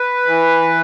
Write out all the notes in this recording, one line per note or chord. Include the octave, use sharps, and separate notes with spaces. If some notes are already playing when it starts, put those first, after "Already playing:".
Already playing: B4
E3